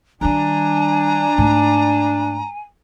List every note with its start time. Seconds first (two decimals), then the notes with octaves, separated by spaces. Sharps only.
0.21 D#3 G3 D4 G#5 A#5
1.38 G#2 A3